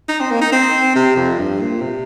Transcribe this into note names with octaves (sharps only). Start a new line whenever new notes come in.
D#4
C4
A#3
D#4
C4
C3
F2
G2
A#2
C3